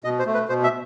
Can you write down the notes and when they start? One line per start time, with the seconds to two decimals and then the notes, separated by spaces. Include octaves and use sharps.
0.04 B2 D#5
0.19 C5
0.26 A3
0.34 B4
0.49 B2 C5
0.64 E5